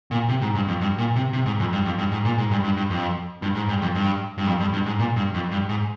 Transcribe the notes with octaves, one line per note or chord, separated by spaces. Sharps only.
A#2
C3
G#2
G2
F2
G2
A#2
C3
C3
G#2
F2
G2
F2
G2
G#2
A#2
G#2
G2
G2
G2
F2
G2
G#2
G2
F2
G2
G2
F2
G2
G2
G#2
A#2
G2
F2
G2
G#2